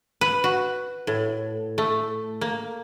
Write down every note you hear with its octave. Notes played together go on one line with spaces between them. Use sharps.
B4
F#4
A2
A3
A#3